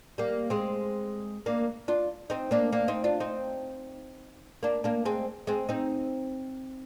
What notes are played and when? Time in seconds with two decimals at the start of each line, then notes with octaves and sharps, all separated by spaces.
0.18 G3 A#3
0.50 G#3 C4
1.46 A#3 D4
1.88 D4 F4
2.30 C4 D#4
2.51 A#3 D4
2.73 A#3 D4
2.88 C4 D#4
3.04 D4 F4
3.20 C4 D#4
4.63 A#3 D4
4.84 A#3 D4
5.05 G#3 C4
5.47 G#3 C4
5.69 C4 D#4